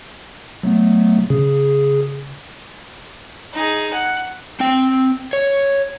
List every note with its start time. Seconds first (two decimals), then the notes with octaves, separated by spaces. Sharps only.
0.63 F#3 A3 B3
1.30 C#3 G#4
3.54 D#4 G#4
3.93 F#5
4.60 C4 G5
5.33 C#5